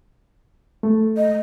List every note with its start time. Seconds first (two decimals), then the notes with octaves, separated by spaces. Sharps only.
0.83 A3
1.17 D#5